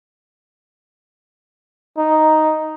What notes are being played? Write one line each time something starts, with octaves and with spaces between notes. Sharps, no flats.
D#4